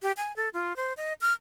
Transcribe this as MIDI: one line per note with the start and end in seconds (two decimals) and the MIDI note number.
0.02 0.12 67
0.17 0.35 80
0.36 0.49 69
0.53 0.76 65
0.76 0.93 72
0.97 1.13 75
1.21 1.33 89